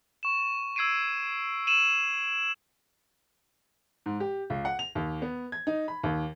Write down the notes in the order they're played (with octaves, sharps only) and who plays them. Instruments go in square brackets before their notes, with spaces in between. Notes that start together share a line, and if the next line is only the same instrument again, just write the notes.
[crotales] C#6 E7
E6 G#6 C7 D7 D#7
D#7 E7 F#7
[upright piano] G#2
G4
C#2
F#5
F7
D#2
B3
G#6
D#4
B5
D#2